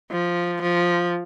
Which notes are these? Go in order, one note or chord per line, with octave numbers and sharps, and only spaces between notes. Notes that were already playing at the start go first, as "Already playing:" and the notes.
F3
F3